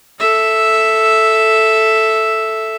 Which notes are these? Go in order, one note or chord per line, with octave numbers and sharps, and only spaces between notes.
A4 E5